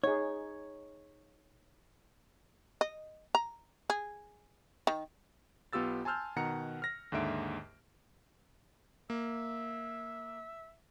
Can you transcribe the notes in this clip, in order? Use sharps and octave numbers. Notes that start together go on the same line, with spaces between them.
D#4 G#4 C#5
D#5
A#5
G#4
D#3
B1 B3 F4 G4 E6 A6
G#5 A5 C6 E6 F6 G6
B2 D#3 F#5 A#5 C#7
F6 A#6
D#2 G#2 D3 E5 D7
A#3 E5